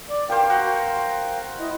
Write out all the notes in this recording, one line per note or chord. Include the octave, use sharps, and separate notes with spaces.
D5
G4 A#4 C5 F5 G5
F#4
E4 D#5